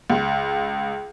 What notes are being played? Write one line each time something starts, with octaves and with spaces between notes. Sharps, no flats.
C#2